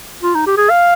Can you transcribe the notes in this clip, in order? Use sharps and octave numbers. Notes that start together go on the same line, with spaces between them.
F4
D#4
G4
G#4
F5